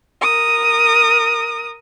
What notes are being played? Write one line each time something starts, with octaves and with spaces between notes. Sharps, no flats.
A#4 D#6